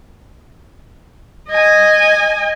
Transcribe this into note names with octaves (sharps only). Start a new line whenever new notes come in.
D#5 G#5